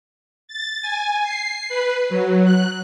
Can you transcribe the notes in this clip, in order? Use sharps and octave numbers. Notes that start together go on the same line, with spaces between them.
A6
G#5
C7
B4
F#3
F#6